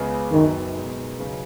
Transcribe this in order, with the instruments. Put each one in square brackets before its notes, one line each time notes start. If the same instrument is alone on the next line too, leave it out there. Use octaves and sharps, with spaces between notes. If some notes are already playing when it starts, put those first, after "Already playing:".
Already playing: [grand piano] C#2 C#3 B3 G#4 B4
[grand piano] F#1 F#2 F#3 B3 [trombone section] D#3
[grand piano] B2 G#3 D#4
C#3 F#3 D#4 B4